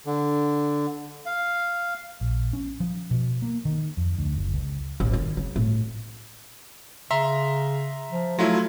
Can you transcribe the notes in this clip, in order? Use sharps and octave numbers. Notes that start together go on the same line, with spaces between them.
D3
F5
A#1
C#4
F3
B2
A#3
D#3
F2
D2
F#1
C#2
A1
D#3
C#3
A2
C#3 E5 A#5 C6
F3
F#3 A3 E4 F4